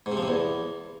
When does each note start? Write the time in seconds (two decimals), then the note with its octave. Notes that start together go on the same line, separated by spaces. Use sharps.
0.06 G#2
0.12 C3
0.17 F3
0.23 C3
0.28 E2